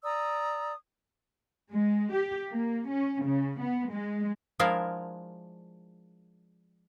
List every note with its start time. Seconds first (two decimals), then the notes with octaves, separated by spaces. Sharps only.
0.04 D5 A#5 D#6 E6
1.71 G#3
2.13 G4
2.50 A#3
2.89 C#4
3.25 C#3
3.59 B3
3.90 G#3
4.59 F3 G#3 D4 E4 A#4 F5